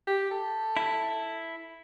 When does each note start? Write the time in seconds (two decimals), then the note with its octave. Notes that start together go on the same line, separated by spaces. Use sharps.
0.07 G4
0.31 A4
0.77 E4